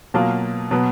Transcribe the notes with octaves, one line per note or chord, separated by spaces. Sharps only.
B2 F#3 A#3 F4
B2 F#3 B3